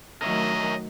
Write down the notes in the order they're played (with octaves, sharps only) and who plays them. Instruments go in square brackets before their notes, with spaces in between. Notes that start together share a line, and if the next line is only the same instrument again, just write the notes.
[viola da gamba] D#3 F#3 A3 [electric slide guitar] A#4 C#5 E5 [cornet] D#5